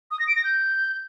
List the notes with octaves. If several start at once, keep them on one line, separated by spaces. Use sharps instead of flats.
D#6
A#6
D7
A#6
G6